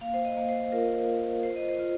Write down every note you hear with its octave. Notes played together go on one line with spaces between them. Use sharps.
A#3 F5
C5
D#5
A#3
C5
F4 A#4
F4
F4 C5
D#5
C5
F4